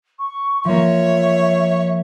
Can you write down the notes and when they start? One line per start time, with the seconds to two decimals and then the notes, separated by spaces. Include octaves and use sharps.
0.19 C#6
0.65 F3 A#3 C#5 E5